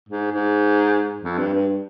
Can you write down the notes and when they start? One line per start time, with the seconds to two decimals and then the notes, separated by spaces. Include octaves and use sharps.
0.09 G#2
0.31 G#2
1.22 F2
1.38 G2
1.54 G2